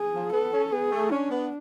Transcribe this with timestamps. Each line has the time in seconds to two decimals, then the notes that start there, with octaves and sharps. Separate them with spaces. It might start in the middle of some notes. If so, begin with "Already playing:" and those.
Already playing: G#4
0.14 F3
0.33 B3 A4
0.53 C#4
0.72 B3 G#4
0.92 A3
1.11 C#4 D4
1.30 B3